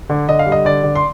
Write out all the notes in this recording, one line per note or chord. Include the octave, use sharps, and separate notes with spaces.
D3
D3 D#5
F5
G3
D#5
D3 D5
D3
C6